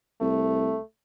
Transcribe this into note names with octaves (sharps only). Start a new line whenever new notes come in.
C2 A3